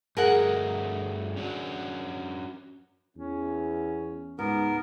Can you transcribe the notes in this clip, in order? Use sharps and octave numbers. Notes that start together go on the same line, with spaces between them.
G2 A3 F#4 G#4 A#4 F#5
C#4 D4 F#4
E2 C#4
C#2 G#2 B3 A#4